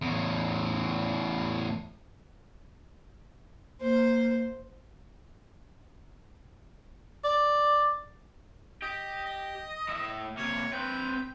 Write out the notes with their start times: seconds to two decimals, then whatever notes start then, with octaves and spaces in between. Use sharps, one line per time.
0.02 E2 A2
3.81 A#3 C5
7.24 D5
8.82 G4 D#5
9.26 D#5
9.88 A2 E5
10.37 C3 A#3 C#5
10.73 C4 B4 G5